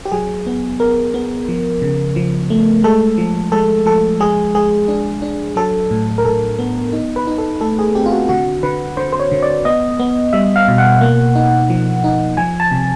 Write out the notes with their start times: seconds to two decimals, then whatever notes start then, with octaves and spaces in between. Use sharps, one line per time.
0.05 G4
0.12 F#3 G#4
0.46 B3
0.80 B3 A#4
1.14 B3
1.49 F3
1.82 C#3
2.16 F3
2.50 A3
2.84 G#3 A4
3.18 F3
3.52 G#3 A4
3.86 F3 A4
4.20 G#3 G#4
4.55 G#3 G#4
4.88 D4
5.22 D4
5.56 F#3 A4
5.91 A2
6.18 A#4
6.25 A2 A4
6.59 B3
6.93 D#4
7.16 B4
7.27 D#4
7.38 A4
7.61 A3 A4
7.79 G#4
7.95 C4 G4
8.06 F4
8.12 F#4
8.29 D3 F#4
8.63 D3 B4
8.97 D3 C5
9.12 C5
9.20 C#5
9.32 D3
9.43 D5
9.65 B3 D#5
10.00 B3
10.33 G3 E5
10.56 F5
10.68 B2
10.78 F#5
11.01 A#3
11.35 D#4
11.70 F3
12.04 D#4
12.37 F3 G#5
12.60 A5
12.71 C3